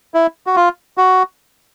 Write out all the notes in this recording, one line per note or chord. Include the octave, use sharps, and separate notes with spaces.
E4
F#4
F4
F#4